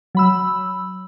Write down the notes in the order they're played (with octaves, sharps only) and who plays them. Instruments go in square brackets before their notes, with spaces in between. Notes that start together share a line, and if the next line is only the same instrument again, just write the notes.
[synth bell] F#3 B5 E6